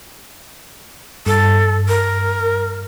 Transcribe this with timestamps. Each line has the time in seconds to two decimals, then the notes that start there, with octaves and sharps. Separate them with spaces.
1.26 G2 A4
1.88 A#4